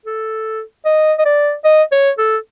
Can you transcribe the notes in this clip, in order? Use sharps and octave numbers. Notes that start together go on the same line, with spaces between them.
A4
D#5
D#5
D5
D#5
C#5
A4